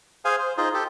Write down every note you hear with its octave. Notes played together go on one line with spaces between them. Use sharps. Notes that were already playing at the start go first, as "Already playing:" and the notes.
G#4 C5 F5 G#5
C5
D#4 F4 G#4 C5
G4 A4